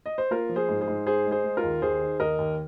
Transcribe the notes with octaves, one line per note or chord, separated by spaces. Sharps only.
D#5
C5
A#3 F4 A#4
F3
G#4 C5
G#2
G#4 C5
G#2
G#3 G#4 C5
G#3
G#4 C5
G#3
F4 A#4
D#2
D#2 G#4 C5
D#3
D#2 A#4 D#5
D#2